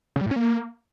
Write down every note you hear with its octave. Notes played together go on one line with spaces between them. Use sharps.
C#3
G3
A2
C#4
A#3